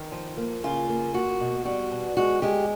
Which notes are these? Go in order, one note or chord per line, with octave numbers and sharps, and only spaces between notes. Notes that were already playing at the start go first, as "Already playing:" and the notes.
Already playing: D#3
F3
A#3
C#3 F4
A#3
A#3 F#4
B2
G3 F#4
B2
G#3 F#4
G#3 G4